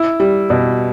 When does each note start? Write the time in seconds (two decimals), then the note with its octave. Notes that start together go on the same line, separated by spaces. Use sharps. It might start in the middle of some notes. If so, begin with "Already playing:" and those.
Already playing: E4
0.20 G3
0.50 B2